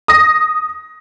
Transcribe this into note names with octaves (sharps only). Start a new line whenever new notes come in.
D#6 A#6